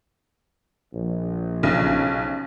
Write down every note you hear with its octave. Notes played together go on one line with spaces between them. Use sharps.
A#1
B1 C#3